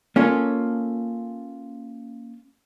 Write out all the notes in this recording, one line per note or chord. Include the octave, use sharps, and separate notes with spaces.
A#3 C#4 F4 A4